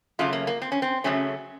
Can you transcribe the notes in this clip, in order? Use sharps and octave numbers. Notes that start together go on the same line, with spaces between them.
F#2 C#3 F#3 A3 F4
A#3
A#3
C4
C#4
C4
F#2 C#3 F#3 A3 C#4